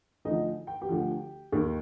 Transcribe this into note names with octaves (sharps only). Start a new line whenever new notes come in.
D2 D3 F3 D#4 D#5
G5
G4 G5
D2 D3 F3
D#2 D#3